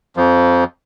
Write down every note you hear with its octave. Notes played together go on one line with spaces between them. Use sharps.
F2 F3